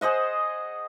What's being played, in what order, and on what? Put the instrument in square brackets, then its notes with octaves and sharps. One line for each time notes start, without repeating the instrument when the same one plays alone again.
[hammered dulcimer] G#4 C5 D#5 F#5